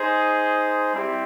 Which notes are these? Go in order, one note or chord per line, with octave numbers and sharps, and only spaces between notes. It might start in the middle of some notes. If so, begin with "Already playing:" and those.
Already playing: D#4 G#4 C5
G3 C4 E4 G4